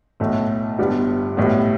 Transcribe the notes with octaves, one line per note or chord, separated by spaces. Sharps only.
B1 A2 A3
G1 G2 G3 B3
B1 A2 G3 B3